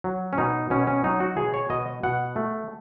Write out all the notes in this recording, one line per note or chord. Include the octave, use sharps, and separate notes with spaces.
F#3
C#4
B2 D#4
B2 C#4
C#4
F#3 D#4
F#4
B2 G#4
C#5
B2 D#5
B2 F#5
A3